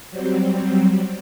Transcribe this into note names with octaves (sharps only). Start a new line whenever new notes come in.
F#3 G3 C4